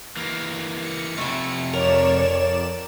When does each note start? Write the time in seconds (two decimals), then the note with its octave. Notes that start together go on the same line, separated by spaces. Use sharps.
0.17 E3 A#3
0.82 C#7
1.18 C3 F3 A3 E4
1.73 F2 A#4 C#5 D5 E7